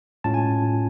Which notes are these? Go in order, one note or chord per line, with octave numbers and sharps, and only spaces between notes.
A2 G#3 C#4 F4 A5
G#5